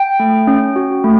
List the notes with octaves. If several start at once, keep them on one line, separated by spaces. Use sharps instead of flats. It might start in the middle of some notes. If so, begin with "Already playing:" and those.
Already playing: G5
A3
C#4
F#4
A3